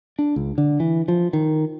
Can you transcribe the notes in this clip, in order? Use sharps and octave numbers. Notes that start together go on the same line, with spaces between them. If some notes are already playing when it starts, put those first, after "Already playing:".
D4
C#2
D3
E3
F3
D#3